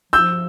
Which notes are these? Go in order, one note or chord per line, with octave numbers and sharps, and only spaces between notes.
F3 E6 G6